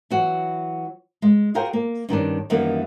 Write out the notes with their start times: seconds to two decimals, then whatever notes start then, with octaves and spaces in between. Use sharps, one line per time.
0.11 E3 F#3 F#4
1.22 G#3
1.54 F4 F#4 G#4 A#4 C5 G5
1.73 A#3
2.09 G2 D#3 C#4 D4
2.50 F#2 D#3 E3 G3 A#3 B3